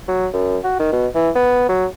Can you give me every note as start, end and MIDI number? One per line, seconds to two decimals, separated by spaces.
0.08 0.27 54
0.33 0.57 42
0.64 0.77 66
0.79 0.93 51
0.93 1.07 47
1.15 1.30 52
1.36 1.66 59
1.69 1.86 54